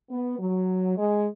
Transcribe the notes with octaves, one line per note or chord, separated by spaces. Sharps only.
B3
F#3
G#3